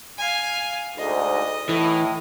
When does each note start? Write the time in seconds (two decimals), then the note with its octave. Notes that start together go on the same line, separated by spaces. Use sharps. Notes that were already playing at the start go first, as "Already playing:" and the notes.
0.18 F5 G#5
0.98 D2 G#2 D#5
1.69 A2 E3